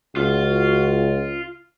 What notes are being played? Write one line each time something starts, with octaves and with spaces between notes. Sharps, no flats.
C#2 F4 F#4